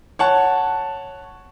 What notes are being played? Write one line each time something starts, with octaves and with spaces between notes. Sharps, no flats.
C#5 F#5 A5